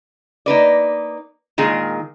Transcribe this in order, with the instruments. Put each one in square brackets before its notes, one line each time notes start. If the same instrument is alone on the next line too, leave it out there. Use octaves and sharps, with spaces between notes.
[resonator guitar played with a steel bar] A#3 D#4 B4 D5
A#2 D#3 G#3 G#4